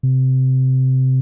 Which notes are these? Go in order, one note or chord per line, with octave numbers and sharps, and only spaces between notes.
C3